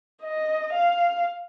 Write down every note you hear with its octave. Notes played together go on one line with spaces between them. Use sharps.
D#5
F5